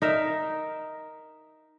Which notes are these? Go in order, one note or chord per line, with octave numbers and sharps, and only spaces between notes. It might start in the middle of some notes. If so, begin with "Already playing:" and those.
D#4 A#4 E5